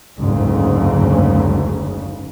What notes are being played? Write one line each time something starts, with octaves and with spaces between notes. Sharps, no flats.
F#1 D2 G#2 C#3